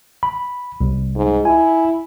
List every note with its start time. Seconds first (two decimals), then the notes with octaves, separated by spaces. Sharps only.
0.23 B5
0.81 C2
1.16 G#2
1.45 E4 G#5